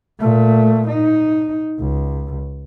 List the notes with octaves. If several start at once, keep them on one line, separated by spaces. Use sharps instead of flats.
A#2 A3
D#4
C#2